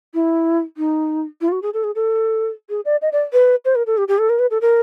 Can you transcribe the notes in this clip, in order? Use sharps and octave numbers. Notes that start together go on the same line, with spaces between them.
E4
D#4
E4
F4
F#4
G#4
A4
G#4
A4
G#4
D5
D#5
D5
B4
C5
A#4
A4
G4
G4
A4
A#4
B4
A4
A#4